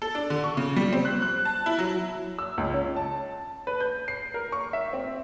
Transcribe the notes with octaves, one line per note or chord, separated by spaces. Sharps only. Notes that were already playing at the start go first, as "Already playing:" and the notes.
A4
D4
D3
C#6
C#3
G3
C4
F#6
F#6
A5
E4
F#3
E6
C#2
C#4
A5
B4
G6
C7
A#4
C#6
E5
C4